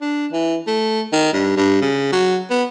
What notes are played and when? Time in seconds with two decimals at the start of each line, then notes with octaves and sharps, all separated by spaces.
0.01 D4
0.32 E3
0.67 A3
1.13 D#3
1.33 G2
1.57 G2
1.82 C#3
2.12 F#3
2.50 B3